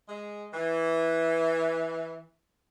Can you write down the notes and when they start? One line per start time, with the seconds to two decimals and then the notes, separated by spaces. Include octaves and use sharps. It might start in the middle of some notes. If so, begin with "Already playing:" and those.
0.08 G#3
0.53 E3